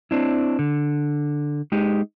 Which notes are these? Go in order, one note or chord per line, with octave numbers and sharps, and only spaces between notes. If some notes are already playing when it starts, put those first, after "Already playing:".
C4 D4 E4
D3
G#3 D#4 G4